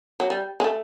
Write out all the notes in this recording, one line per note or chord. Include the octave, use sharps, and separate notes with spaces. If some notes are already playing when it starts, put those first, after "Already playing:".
F#3
G3
G#3
A3